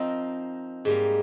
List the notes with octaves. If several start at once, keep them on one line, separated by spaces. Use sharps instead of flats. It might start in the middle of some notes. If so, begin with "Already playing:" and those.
Already playing: F3 C4 D#4 A#4
G#2 G3 A#3